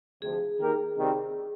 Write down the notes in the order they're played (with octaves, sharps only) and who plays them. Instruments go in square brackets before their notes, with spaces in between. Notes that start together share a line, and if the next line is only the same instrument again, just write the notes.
[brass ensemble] D2 C3 F3 [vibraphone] G#4
[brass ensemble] D#3 A#3 D#4 G4 A#4
C3 D#3 G3 C4